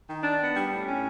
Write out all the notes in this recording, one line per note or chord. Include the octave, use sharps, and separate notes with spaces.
D#3
D4
B3
G3
A2
C#4